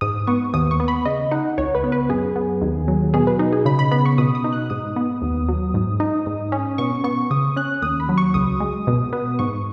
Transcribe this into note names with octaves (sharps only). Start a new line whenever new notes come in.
G#2 D#6
B3 C#6
D#2 D#6
C#6
B3
B5
C#3 D#5
D#4 F#5
C#2 C#5
B4
B3
B4
F#2 G#4
B3
D#2
F#3
B2 G#4
B4
D#4
G#4
C#3 B5
B5
B3 B5
C#6
B2 D#6
D#6
D#4
F#6
G#2 D#6
B3
D#2
F#3
G#2
D#4
G#2
C#4
B2 C#6
B3 C#6
C#3 D#6
C#4 F#6
D#2 D#6
B5
F#3
C#6
C#2 D#6
G#3
B2
B3
G#2 C#6